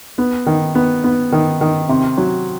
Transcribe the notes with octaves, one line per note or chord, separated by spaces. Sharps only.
B3
D#3
B3
B3
D#3
D#3
C3
F#3